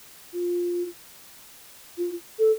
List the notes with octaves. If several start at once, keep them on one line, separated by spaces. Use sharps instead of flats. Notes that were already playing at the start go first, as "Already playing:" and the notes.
F4
F4
A4